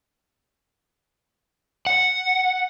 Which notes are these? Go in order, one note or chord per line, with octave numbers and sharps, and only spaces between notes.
F#5